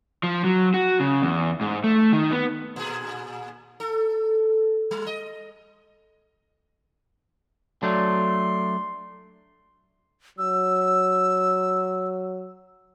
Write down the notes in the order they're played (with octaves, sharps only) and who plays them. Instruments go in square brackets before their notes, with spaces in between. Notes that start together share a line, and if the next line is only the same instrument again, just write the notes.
[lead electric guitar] F3
F#3
F#4
C#3
E2
G#2
A3
D#3
B3
[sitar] A#2 G#4
A4
G3
D#5
[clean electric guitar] F#3 A3 D4 [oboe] C6
[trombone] F#3 [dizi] E6